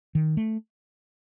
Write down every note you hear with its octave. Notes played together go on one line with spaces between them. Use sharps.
D#3
A3